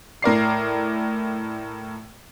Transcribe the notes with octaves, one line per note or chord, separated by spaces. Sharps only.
A2 A#4 D5 C7